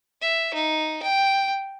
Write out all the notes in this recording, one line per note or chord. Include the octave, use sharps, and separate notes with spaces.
E5
D#4
G5